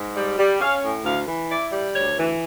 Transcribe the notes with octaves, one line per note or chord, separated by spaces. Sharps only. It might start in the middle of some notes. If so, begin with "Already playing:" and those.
Already playing: G#2
G3
G3
C#4 F5
A2
D2 F5
E3
E4 D5
G3
D2 C#5
E3